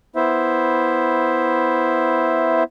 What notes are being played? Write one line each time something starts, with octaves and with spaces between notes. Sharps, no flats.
B3 E4 C5 E5